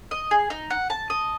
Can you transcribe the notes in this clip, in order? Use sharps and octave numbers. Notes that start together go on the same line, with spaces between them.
D#5
G#4
D#4
F#5
A5
D#5